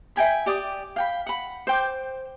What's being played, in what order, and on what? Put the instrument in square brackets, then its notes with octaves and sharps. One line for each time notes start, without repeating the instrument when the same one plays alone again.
[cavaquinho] E5 G5 G#5 B5
G4 D5 D6 D#6
F5 G5 B5
F#5 B5
C5 G5 D6